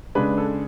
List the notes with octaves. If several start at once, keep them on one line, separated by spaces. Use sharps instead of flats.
C#3 G#3 D4 B4
A4